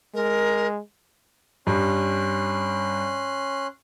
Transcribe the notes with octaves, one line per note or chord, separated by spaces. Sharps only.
G#3 A#4
G2 C#4 C6 F#6